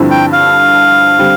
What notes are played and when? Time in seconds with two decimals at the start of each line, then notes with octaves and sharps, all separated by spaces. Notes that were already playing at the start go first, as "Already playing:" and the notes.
Already playing: G2 D3 F3 C4 E4
0.11 G5
0.33 F5
1.19 D3 G3 C4